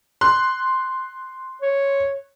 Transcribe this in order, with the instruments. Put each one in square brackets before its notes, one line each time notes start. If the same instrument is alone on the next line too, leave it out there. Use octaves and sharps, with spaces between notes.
[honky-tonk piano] C6 F#6
[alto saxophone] C#5